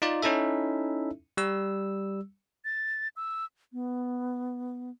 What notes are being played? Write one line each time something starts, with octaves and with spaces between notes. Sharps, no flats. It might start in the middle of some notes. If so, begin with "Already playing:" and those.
D#4 F4 D5
C#4 D#4 E4 A4 E5
G3 E6
A6
E6
B3